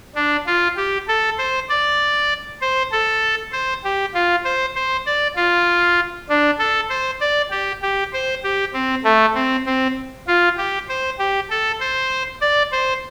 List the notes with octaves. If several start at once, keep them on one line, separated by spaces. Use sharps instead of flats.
D4
F4
G4
A4
C5
D5
C5
A4
C5
G4
F4
C5
C5
D5
F4
D4
A4
C5
D5
G4
G4
C5
G4
C4
A3
C4
C4
F4
G4
C5
G4
A4
C5
D5
C5